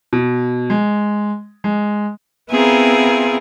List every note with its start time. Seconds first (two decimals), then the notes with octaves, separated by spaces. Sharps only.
0.13 B2
0.70 G#3
1.64 G#3
2.50 B3 C4 E4 F4 G#4 A#4